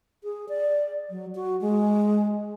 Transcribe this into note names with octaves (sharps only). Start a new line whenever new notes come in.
G#4
D5
F#3
F#4
G#3